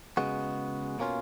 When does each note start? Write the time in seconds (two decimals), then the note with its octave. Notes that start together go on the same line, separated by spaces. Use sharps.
0.17 C#3 G#3 B3 F#4
0.99 B2 A#3 C#4 F4